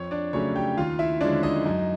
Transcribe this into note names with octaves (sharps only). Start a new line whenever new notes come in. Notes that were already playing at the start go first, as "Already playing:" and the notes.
Already playing: F2 C#5
D4 D5
C#3 F#3 A3 C#4 C#5
G4 G5
D#2 F4 F5
E4 E5
D3 F3 G#3 C#4 D4 D5
D#4 D#5
F#2